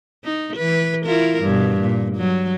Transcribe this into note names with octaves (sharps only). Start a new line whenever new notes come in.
D#4
E3 B4
E4 F4 A#4
G2 B2
A#2
F#3